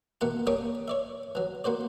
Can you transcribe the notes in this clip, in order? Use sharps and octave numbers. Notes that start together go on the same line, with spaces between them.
B2 E3 A#3 F#5 A5
G3 A#3 C#5 A5 D6 D#6
C#5 D5 E5
E3 F#3
A#3 F#4 C5 D5